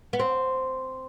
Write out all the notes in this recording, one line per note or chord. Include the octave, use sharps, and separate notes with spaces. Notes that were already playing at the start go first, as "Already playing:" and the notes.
B3
C4